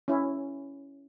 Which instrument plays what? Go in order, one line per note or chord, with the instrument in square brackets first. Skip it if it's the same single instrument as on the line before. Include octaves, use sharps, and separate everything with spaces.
[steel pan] C#4 E4